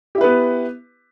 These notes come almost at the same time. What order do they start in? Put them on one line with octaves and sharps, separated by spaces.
G4 E4 B4 B3